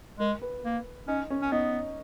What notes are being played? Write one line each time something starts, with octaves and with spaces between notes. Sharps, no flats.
G#3 A#4
B4
A#3
C#4 D#4
C#4
C#4
B3 D#4